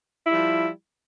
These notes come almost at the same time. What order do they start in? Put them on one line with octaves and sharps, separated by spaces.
E4 G3 F3